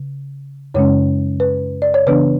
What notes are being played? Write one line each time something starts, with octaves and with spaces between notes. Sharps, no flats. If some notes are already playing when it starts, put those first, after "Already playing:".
Already playing: C#3
F#2 C#3 G#3 C#4 C#5
B4
D5
C#5
C#3 E3 B3 D4 B4